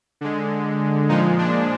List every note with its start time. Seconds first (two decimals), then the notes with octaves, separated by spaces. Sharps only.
0.21 D3 G#3
1.09 A#2 F3 G#3 D#4
1.39 D4